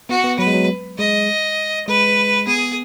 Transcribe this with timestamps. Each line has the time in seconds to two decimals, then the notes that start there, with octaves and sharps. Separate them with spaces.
0.09 B3 F#4
0.24 B3
0.39 F#3 B4
0.47 G#3
0.54 F#3
0.98 G#3 D#5
1.88 G#3 B4
2.47 B3 G#4